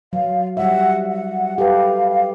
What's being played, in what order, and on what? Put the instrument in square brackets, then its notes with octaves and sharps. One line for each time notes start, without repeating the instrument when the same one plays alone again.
[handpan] F#3 [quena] F5
[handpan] G3 E5 [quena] F#5
[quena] F#5
[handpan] G4 A4 B4 [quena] F5